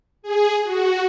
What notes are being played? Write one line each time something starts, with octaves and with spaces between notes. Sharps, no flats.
G#4
F#4